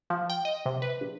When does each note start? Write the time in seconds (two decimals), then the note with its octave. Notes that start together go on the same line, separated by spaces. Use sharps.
0.10 F3
0.30 G5
0.45 D#5
0.66 C3
0.82 B4
1.01 A#1